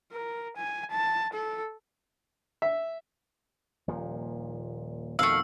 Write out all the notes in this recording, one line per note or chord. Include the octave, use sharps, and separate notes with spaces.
A#4
G#5
A5
A4
E5
D#1 A#2 F3
F2 B2 D#3 A3 F5 E6